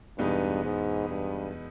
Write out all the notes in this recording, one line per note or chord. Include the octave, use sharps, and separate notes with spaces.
E2 G2 B2 G#3 B3 D#4
G#2
G2